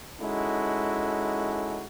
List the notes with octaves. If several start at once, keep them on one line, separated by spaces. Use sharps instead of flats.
G#3 C#4 D#4 E4 F#4 A4